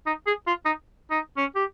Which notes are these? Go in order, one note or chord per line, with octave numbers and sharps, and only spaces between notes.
D#4
G#4
F4
D#4
D#4
C#4
G4